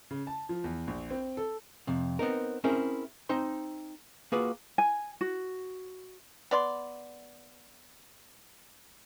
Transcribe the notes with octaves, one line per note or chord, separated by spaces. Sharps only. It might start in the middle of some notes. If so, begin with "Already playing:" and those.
C#3
A5
F3
E2
A#1
C4
A4
F2 C3
B3 C4 D#4 A#4
C4 C#4 E4 G#4 A#4 C5
C4 D#4 C5 C6
A#3 F4 F#4 G#4 B4
G#5
F#4
B3 D5 C6